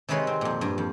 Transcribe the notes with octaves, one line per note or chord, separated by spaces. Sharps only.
C3 D#3 G#3 B4 C#5 C6
C4
F2 A#2
G2
F2